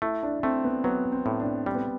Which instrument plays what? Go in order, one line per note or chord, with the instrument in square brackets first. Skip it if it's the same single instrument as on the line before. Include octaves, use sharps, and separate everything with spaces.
[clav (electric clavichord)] A3 [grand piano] E4
[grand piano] D4
[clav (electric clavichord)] A3 [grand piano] C4
[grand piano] B3
[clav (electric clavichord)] F#3 [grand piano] B3
[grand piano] C4
[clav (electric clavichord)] A2
[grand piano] D4
[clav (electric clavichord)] G3 [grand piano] C4
[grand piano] B3